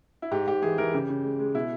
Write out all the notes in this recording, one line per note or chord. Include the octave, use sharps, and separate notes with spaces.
E4
G#2 G4
G#2 G4
E3 G#4
E3 A#4
C#3 G4
C#3
G#3
G#3
B2 E4